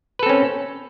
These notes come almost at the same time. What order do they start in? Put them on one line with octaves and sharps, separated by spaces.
B4 A4 C4 C#4